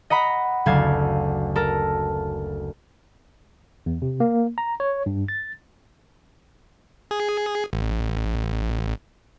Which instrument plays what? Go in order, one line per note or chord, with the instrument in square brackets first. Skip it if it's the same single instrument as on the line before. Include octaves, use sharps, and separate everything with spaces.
[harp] D#5 F#5 A#5 B5
F#1 D2 A4 F5 G#6
A4 A#4
[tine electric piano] E2
C3
A#3
A#5
C#5
G2
A6
[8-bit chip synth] G#4
A1